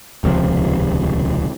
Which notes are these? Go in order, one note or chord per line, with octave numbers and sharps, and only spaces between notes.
D#1 C#2 C3 F3